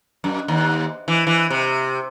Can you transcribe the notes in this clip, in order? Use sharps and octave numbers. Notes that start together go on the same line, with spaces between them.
F#2
D#2
E3
E3
C3